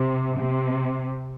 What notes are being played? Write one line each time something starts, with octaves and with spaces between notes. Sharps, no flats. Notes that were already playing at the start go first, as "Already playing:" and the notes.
Already playing: C3
C3